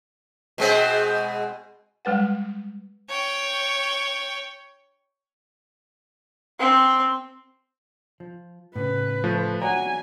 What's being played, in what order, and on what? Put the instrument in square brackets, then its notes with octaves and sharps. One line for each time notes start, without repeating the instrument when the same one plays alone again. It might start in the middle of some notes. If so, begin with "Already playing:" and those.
[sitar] B2 G#3 C4
[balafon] G3 G#3 B4 F#5
[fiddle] C#5 G5
[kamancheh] C4
[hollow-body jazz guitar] F3
[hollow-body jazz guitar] A2 C#3 [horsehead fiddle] B4
[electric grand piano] F3 A3
[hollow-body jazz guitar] F#4 C#5 D5 [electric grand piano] F#5 A#5 [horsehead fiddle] G#5